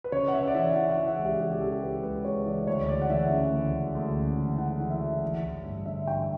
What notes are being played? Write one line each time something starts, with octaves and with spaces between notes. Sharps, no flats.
B4
C#3 C#5
F#5
C#3 E5
D5
E3 E5
E3 F#5
F#5
E3
E5
C#2
G4
E3 G4
G4
C#3 A4
C#2 B4
C#2 B4
C#2 C#5
E3 D5
D2 C#5
D2 D5
F#5
E3 E5
C#3
D2
D2
D2
C#3
E3
E3 F#5
E3
E5
E3
A1
A1
G2
D3 E5
G2 G5